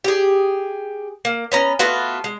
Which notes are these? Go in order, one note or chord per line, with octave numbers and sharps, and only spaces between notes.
G4 G#4
A#3
B3 C#4 A#5
A3 B3 F4 F#4
G#3